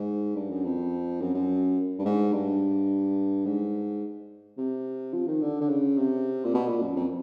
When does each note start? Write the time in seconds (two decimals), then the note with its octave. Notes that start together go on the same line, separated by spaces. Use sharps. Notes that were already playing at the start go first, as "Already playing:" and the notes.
Already playing: G#2
0.36 G2
0.50 F#2
0.64 F2
1.21 F#2
1.34 F#2
1.99 G2
2.05 G#2
2.33 G2
3.45 G#2
4.58 C3
5.13 F3
5.28 D#3
5.42 D3
5.61 D3
5.69 C#3
5.98 C3
6.45 A#2
6.54 B2
6.68 A#2
6.82 F#2
6.96 F2